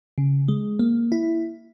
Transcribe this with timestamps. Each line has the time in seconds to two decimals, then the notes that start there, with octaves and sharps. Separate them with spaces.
0.18 C#3
0.48 G#3
0.79 A#3
1.12 E4